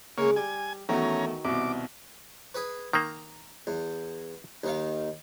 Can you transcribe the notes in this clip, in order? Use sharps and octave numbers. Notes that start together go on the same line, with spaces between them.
C#3 G#3 A#3 C#5
G3 G#5
E2 D#3 F#3 A3 C#4 A#5
C2 B2 D6
G#4 B4
D#3 A#3 A#5
E2
D#2 D#3 F5